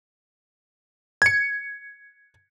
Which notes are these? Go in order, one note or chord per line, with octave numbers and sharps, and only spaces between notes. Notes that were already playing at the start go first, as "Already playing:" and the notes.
G#6 C#7